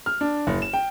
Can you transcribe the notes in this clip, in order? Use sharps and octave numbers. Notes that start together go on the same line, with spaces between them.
F6
D4
F#1
E7
G5